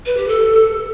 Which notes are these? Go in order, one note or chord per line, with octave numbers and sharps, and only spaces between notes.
B4
G4
A4